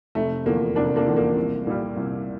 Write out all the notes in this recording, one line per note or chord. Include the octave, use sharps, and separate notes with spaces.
F1 A3
E2 D3 F3 A#3
F1 A#3 D4
A#3 D4
E2 D3 F3
A#3
C2
A#2 G3
C2